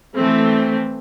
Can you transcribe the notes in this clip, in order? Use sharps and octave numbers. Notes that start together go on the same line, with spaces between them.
E3 A3 C4